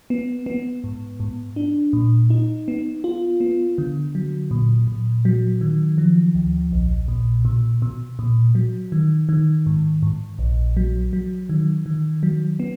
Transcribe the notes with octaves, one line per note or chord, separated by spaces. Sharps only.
B3
B3
G#2
G#2
D4
A#2
D#4
B3
F4
B3
D3
F#3
A#2
A#2
F#3
D#3
F3
D2
A#1
A#2
B2
B2
A#2
F#3
D#3
D#3
G#2
G#2
A#1
F#3
F#3
D#3
D#3
F#3
B3